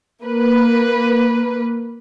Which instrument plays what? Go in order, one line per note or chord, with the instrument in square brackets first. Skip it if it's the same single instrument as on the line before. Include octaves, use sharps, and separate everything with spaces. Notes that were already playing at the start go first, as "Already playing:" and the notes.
[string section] A#3 B4